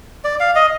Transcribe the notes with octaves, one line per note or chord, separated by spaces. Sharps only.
D5
F5
D#5